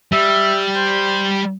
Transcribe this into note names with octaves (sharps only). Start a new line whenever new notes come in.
G3 E5
C5